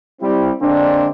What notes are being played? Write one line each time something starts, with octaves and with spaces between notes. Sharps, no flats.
G3 C4 E4
D3 G#3 A#3 C4 D4